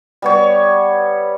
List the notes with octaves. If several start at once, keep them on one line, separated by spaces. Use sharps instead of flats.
G3 B3 C#5